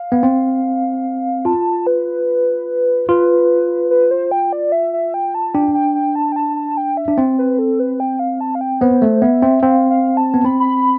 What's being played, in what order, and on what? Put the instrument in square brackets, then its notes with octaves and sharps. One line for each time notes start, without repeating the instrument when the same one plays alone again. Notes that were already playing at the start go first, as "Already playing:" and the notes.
Already playing: [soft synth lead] F5
[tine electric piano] B3
C4
[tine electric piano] F4 [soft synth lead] A5
[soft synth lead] B4
[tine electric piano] F4 [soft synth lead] B4
[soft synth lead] B4
C5
G5
D5
E5
E5
G5
A5
[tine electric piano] D4 [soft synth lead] G5
[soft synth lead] G5
G5
A5
G5
A5
A5
G5
E5
[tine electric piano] D4
C4
[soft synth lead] B4
A4
B4
G5
F5
A5
F5
G5
[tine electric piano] B3 [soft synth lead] C5
[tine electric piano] A3
[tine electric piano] B3 [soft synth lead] E5
[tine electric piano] C4
[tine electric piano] C4 [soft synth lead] F5
[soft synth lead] F5
A5
[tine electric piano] B3
[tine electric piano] C4 [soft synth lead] B5
[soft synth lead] B5